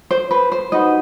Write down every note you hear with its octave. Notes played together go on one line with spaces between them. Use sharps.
C5
B4
C5
D#4 F#4 B4 D#5